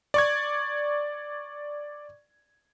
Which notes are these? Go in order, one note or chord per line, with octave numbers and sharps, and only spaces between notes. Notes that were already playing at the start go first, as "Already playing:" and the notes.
D5 C#6 G#6